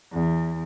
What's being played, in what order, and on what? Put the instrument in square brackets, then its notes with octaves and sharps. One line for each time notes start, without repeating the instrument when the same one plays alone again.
[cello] E2